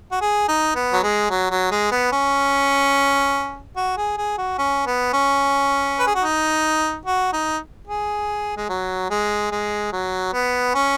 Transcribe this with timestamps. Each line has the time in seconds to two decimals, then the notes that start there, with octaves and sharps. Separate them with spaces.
0.11 F#4
0.21 G#4
0.48 D#4
0.75 B3
0.93 F#3
1.03 G#3
1.30 F#3
1.51 F#3
1.71 G#3
1.92 B3
2.12 C#4
3.76 F#4
3.97 G#4
4.18 G#4
4.38 F#4
4.59 C#4
4.86 B3
5.13 C#4
5.99 B4
6.06 G#4
6.15 F#4
6.23 D#4
7.06 F#4
7.33 D#4
7.88 G#4
8.57 G#3
8.69 F#3
9.10 G#3
9.52 G#3
9.93 F#3
10.33 B3
10.75 C#4